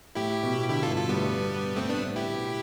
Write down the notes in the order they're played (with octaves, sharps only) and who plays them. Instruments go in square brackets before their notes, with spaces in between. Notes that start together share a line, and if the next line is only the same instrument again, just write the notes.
[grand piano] A2 [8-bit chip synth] E4 G4
[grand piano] B2
[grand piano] D3 [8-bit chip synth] E4 G4
[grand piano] G2 [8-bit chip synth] F4 A4
[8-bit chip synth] F4 A4
[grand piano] A2 [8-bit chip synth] G3 B3
[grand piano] G2
[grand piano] G2 [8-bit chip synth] A3 C4
[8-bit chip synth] B3 D4
[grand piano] A2
[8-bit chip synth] E4 G4
[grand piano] B2